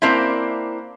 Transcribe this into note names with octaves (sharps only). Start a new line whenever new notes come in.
A#3 C4 D4 E4